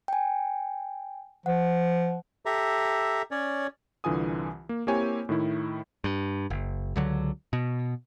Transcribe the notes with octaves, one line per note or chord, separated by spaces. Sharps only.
G5 G#5
F3 F#5
G4 A4 E5 A#5
C#4 C#5 D5
C2 D3 E3 F4 G#5 D#6
A#3
A#3 C4 E4 G4 C#5 G#5
A2 D#3 E4
G2
F#1
C#2 D3 F#3
B2